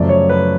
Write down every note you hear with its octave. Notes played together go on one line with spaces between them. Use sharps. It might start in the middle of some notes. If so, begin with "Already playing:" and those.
Already playing: F#2 C#3 F3 A3 D5
C#5
B4